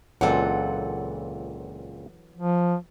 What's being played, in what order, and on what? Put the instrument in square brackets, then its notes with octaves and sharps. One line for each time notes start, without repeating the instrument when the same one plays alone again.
[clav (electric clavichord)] C#2 A#2 C4 [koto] E3 F#3 A4 [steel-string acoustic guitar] F#5
[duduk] F3